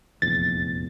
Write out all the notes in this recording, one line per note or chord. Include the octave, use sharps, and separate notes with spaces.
F1 A#1 E2 A6